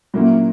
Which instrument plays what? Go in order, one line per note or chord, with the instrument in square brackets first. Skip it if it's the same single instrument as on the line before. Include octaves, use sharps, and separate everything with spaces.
[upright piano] A#2 F#3 A#3 C#4 E4